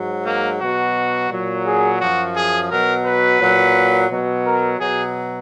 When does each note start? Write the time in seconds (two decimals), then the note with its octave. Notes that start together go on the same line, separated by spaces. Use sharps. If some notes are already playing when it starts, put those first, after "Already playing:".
Already playing: G#2 F#3
0.26 A#3
0.60 B2 F#3 F#4
1.30 A#2 F#3
1.66 G#4
2.00 F#2 F3 F#4
2.36 G#4
2.70 B2 F#3 A#4
3.05 B4
3.40 A#2 F#3
4.10 B2 F#3
4.45 A#4
4.80 B2 F#3 G#4